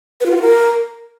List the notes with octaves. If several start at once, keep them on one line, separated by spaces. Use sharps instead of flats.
B4
F4
F#4
F4
A#4